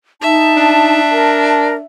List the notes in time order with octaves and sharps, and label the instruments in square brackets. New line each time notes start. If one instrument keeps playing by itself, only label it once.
[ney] D#4 [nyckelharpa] E5 [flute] A5
[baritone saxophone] D4
[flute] A#4 [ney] A5